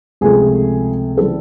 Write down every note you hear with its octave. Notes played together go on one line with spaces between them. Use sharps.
C#2 C3 F3 A3 G#4
C#3 E3 G3 A4